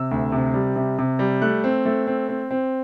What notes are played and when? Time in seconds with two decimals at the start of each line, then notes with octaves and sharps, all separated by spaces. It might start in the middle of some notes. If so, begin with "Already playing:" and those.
Already playing: C3 E6
0.11 D2
0.32 C3
0.54 G3
0.76 C3
0.99 C3
1.19 G3
1.42 A3 F#6
1.64 C4
1.85 A3
2.07 C4
2.29 C4
2.51 C4